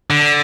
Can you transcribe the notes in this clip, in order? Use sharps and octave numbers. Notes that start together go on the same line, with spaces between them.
D3